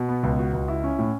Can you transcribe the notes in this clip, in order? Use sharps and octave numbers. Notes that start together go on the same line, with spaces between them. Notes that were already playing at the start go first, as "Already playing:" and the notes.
Already playing: B2
B3
C#2
F#4
C#2
E4
C#4
A2